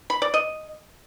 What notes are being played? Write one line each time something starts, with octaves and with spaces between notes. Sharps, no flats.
B5
D5
D#5